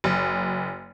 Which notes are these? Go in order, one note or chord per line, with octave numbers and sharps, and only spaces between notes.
F#1